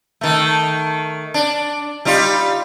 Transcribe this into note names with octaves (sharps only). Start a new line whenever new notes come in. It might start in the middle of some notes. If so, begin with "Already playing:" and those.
D#3 A3
D4
G3 D#4 F4